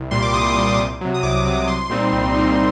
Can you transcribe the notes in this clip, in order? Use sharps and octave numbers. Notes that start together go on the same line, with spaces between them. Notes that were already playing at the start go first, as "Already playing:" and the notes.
Already playing: C2
A#2 G3 C6
D6
C2 D#6
A#2 G3
C2
C3 F#3
D#6
C2 D6
C3 F#3
C2 C6
A#2 G3 C4 D#4
C2
A#2 G3 C4 D#4